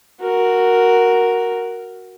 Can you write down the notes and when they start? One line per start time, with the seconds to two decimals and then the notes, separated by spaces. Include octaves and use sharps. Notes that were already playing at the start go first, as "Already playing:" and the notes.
0.21 F#4 A#4